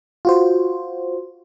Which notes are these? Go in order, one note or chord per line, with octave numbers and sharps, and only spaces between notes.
F4 F#4 C5